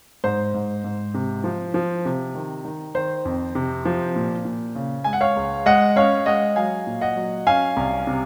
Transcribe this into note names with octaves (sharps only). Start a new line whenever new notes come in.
G#2 C5
G#2
G#2
C3
F3
F3
C3
D#3
D#3
D#3 C5
F2
C3
F3
A#2
A#2
C#3
G#3 G#5
F#5
C#5 F5
C#2
G#3 D#5 F#5
C#4 C#5 F5
G#3 D#5 F#5
F#3 F5 G#5
A#2
D#5 F#5
F#3
C#4 F5 G#5
C2
C3